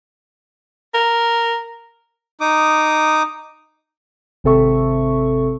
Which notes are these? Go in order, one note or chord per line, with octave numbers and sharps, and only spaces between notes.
A#4
D#4 D6 D#6
G#1 C3 C4 A4 E5 C#6